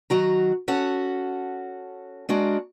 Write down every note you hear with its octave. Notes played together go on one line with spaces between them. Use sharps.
D#3 F#3 F#4 A#5
C#4 F#4 A4 F#5
G#3 D4 F#4 A#4